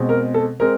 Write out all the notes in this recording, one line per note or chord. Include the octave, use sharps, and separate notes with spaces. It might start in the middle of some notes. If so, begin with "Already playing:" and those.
Already playing: B2 G#3 C4
A#4
A4
G#3 C4 A#4